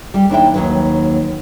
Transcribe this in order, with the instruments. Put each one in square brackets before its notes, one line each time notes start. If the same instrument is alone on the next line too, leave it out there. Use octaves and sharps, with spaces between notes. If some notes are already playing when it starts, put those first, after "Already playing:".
[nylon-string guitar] G3 G4
D#2 D4 E4 G5
D#2 F#3 B4